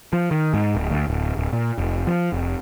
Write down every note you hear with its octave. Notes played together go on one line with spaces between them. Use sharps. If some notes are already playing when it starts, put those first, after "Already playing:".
F3
D#3
G#2
D1
D2
D1
D1
A#2
F1
F3
F1